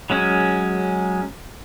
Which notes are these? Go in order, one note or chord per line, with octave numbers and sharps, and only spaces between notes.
F#3 G#3 C#4